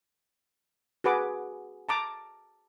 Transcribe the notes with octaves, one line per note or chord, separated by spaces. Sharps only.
F#4 G#4 B4 D6
A5 A#5 D6